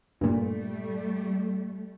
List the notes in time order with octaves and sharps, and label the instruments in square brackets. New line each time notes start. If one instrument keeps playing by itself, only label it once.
[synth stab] G2 A#2 [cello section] G3 A3